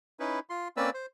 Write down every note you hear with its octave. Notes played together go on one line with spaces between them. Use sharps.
C#4 D#4 E4 B4
F4 C6
A#3 C4 C#4 B4 D5 E6
C5